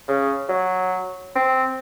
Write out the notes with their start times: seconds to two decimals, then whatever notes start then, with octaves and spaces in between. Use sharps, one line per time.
0.08 C#3
0.49 F#3
1.36 C4